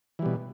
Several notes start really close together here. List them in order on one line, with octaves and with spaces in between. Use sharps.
E3 G3 B2